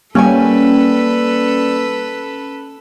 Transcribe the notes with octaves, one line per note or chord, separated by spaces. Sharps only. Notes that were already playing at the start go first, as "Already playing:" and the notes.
G3 A#3 C#4 A4 B4 G5 G#5